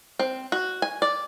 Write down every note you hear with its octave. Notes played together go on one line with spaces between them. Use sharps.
C4
F#4
G#5
D5